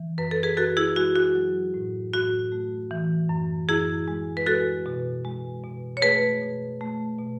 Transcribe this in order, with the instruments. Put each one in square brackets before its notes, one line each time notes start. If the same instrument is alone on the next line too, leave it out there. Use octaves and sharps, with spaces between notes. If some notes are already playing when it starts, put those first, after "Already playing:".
Already playing: [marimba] E3
F#2 B4
A4
G#4 B4
F#2 F#4 A4
E4 G#4
G#3 F#4
F#4
F#3
A2
A2 F#4
A3
E3
F#2
F#2 E4 G#4
G#3
B4
G#3 F#4 A4
B2
G#3
B2
C#5
A3 G#4 B4
B2
A3
B2